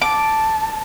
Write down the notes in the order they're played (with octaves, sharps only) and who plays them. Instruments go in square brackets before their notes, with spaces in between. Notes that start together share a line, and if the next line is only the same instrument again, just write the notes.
[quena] A5 [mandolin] D6